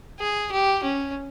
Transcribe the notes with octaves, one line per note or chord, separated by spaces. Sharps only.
G#4
G4
C#4